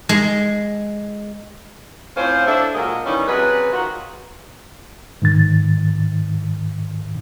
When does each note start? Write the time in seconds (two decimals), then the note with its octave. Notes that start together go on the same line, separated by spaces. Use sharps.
0.09 G#3
2.16 A2 C4 C#4 F4 C5
2.47 D4 E4 A4
2.74 A#2 F#3 G#3 F4 A#4 D#5
3.06 D#3 E3 G3 C#4 D#4
3.28 C3 F#3 C#4 G#4 B4
3.72 D#3 D#4 F4 F#4
5.22 G#2 D#3 A6